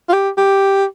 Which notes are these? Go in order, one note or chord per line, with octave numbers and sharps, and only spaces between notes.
F4
G4
G4